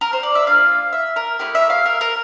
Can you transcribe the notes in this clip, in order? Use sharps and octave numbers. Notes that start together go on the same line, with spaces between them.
A#4
C5
D5
E5
A#3 D4 F4 F5
E5
A#4
A3 C4 E4 G4 A#4
E5
F5
A#4
A#4